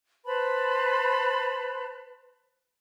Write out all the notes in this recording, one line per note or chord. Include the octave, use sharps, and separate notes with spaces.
B4 C5 A5 B5